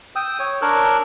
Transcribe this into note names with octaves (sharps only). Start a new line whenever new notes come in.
G5 D#6 E6
C#5
D4 A#4 C#5 C#6 E6 F#6